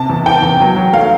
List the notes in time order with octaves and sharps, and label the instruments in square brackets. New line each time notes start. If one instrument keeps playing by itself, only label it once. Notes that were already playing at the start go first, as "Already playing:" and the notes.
Already playing: [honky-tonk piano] C3 A5
E2
E3 G5
E2
F#3
F#3
A3 F5